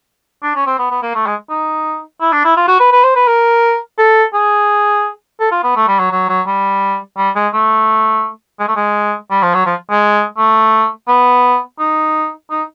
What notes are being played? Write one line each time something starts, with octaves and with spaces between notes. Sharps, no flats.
D4
C#4
C4
B3
B3
A#3
A3
G#3
D#4
E4
D4
E4
F4
F#4
B4
B4
C5
B4
A#4
A4
G#4
A4
F4
B3
A3
G3
F#3
F#3
F#3
G3
G3
G#3
A3
G#3
A3
G#3
G3
F3
F#3
F3
G#3
A3
B3
D#4
D#4